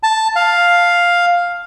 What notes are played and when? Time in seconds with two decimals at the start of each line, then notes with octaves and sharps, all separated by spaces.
0.03 A5
0.36 F5